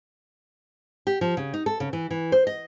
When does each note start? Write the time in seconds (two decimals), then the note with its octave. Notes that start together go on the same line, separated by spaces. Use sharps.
1.07 G4
1.21 F3
1.37 C#3
1.54 D#4
1.66 A4
1.80 C#3
1.93 E3
2.11 E3
2.32 C5
2.47 D#5